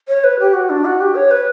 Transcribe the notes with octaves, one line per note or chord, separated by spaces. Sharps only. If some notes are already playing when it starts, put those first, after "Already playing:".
C#5
B4
G4
F#4
D4
F#4
G4
C#5
B4